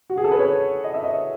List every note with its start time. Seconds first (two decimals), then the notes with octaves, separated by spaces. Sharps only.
0.10 F#4
0.17 G#4
0.24 A4
0.32 B4
0.39 C#5
0.84 D#5
0.94 E5
1.04 D#5